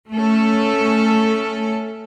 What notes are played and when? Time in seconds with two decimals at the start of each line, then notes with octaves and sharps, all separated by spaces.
0.12 A3 C#4 A4